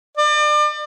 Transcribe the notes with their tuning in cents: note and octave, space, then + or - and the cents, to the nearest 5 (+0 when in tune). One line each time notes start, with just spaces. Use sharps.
D5 +35